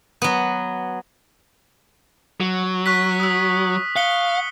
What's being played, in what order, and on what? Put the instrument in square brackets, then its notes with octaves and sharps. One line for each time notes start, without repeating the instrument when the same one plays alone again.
[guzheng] F#3 B3
[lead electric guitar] F#3
[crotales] C#6 F#6 B6
D#6 E6
[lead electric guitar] F5 [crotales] F#6 C#7 G7